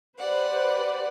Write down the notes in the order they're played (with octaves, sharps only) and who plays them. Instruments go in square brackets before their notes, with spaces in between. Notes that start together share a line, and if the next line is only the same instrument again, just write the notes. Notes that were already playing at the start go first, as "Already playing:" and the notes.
[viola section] G4 B4 C5 [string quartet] D5 F#5